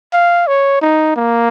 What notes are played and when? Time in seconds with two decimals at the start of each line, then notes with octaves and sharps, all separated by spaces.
0.13 F5
0.47 C#5
0.82 D#4
1.16 A#3